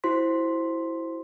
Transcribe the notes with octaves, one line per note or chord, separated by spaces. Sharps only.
E4 F#4 C5 C6 B6